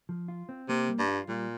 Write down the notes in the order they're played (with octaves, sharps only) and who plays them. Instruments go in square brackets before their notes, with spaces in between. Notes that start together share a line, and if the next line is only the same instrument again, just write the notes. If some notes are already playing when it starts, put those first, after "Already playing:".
[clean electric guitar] F3
F4
C4
[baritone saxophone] C3 [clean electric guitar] A#3
[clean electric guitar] G3
[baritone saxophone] G2
[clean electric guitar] F4
[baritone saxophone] A#2 [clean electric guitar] G3